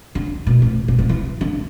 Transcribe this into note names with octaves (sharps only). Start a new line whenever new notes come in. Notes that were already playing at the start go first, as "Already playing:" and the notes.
D3
B2
A2
B2
C3
E3
D3